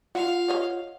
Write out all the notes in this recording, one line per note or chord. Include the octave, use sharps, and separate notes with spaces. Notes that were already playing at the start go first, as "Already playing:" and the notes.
F4 F5 F#5
C#5 D#5 F#5